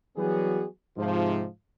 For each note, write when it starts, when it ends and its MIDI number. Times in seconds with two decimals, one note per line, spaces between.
0.17 0.66 52
0.17 0.66 54
0.17 0.66 55
0.17 0.66 59
0.17 0.66 66
0.17 0.66 68
0.97 1.46 44
0.97 1.46 48
0.97 1.46 53